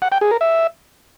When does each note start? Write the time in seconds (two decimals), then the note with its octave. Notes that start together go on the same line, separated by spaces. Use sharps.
0.02 F#5
0.12 G5
0.21 G#4
0.31 A#4
0.41 E5